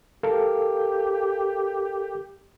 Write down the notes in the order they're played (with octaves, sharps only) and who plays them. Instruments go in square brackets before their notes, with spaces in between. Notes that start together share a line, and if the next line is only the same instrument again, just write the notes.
[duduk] G4 [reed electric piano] A4 A#4 F5